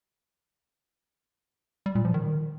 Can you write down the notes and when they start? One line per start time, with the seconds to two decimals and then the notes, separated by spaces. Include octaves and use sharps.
1.86 G3
1.95 A#2
2.05 F3
2.14 D#3